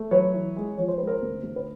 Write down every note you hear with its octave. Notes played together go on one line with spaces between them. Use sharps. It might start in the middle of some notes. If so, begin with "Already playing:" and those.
Already playing: A3
F#3 B4 C#5
E3
G#3
F3 C#5
C5
G#3 B4
A#4 C5
D2
D2
B4